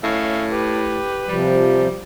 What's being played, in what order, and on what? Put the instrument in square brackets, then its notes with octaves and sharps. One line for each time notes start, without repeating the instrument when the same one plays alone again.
[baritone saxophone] A2 [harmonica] C#4 E5 F5
[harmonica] G4 B4
[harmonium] C3 F3 [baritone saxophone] G3